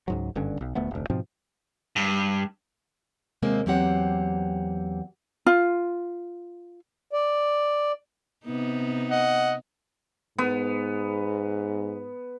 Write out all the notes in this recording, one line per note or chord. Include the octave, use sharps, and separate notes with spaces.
C#2 G#2 F#3
F#1 G2 D3 C#4
B1
D#1 D2 A3 B3
F1 D2
G#2 B2 F3 C4
G2
D#2 C3 G#3 A#3 C4
E2 F#3 A#3 C4 G4 F#5
F4
D5
C3 B3 D#4
D#5 F#5
G#2 B3